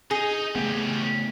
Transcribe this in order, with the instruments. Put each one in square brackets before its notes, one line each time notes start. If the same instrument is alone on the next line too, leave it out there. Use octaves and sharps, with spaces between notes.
[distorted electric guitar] D#4 D#5 [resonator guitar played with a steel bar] G#4
[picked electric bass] C#3 A3 B3 [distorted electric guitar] C#4 G4